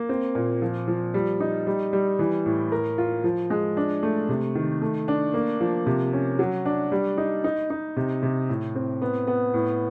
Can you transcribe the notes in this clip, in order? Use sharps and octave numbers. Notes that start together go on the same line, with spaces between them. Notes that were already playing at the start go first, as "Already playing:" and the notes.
Already playing: A#3
C4
A#2
F3
F3
G3
D#4
G3
G3
E3
A2
A#4
F4
F3
G#3
D4
A3
C3
D#3
A3
D4
A#3
F3
C3
C#4
F#3
D4
G3
D#4
D#4
D#4
C3
C3
A2
C4
B3
B3
A2